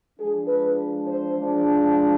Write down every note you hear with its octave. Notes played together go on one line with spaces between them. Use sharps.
F3 G#3 D4 G#4
B4
C5
F3 G#3 D4